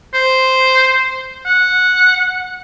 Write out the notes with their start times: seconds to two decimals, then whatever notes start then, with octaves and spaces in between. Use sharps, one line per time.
0.14 C5
1.45 F#5